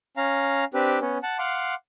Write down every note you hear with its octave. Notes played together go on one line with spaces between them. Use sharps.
C#4 F5 A#5
C4 D4 G4 B4
B3 C#4
F#5 A5
F5 F#5 C6 D6